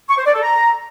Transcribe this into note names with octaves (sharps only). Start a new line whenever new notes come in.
C#6
C5
D5
A4
A#5